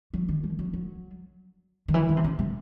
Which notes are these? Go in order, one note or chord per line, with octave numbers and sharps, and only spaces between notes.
F#3
D#3
E3
F#3
F#3
D#3
E3
D#3
C3
C#3
C3